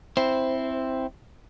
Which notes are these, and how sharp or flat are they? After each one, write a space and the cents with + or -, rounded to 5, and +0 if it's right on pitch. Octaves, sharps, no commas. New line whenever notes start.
C4 +0 E4 +0 C5 +0